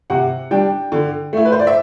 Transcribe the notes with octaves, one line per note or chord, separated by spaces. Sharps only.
C3 F#5
G3 D4 G5
D3
A3 E4
B4
C5
D5
E5